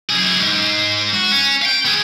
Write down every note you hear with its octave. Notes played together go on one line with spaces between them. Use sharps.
F#2 G#4
G#2
F#4
C#4
F5 G5
B3 G#4